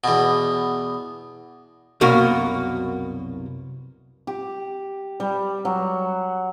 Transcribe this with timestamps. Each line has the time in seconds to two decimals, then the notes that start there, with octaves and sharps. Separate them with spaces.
0.04 E2 B2
2.01 C2 F#2 B2 A#3 F#4
4.27 G4
5.20 G3
5.65 F#3